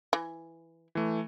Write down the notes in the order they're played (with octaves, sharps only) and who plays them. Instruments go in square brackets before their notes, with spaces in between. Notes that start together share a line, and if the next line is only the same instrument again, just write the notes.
[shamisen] E3
[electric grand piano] E3 A3